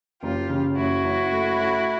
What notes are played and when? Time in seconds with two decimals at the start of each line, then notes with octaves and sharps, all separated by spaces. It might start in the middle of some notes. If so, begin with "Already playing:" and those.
0.22 F#1 F4 G4
0.49 C#3
0.76 F#1 E4 F#4
1.04 F#1
1.32 A3
1.59 A3